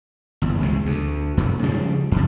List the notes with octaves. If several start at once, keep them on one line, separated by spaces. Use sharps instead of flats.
G1 E2
C#2 C3 G#3
D2
F2 A#2 D#3
C#3 F3 G3 G#3
F2 C3